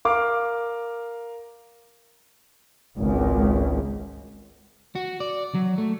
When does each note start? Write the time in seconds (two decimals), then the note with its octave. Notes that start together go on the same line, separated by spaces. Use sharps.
0.05 A#4 F5 D6
2.97 G#1 C#2
4.95 F#4
5.20 D5
5.55 F#3
5.78 A3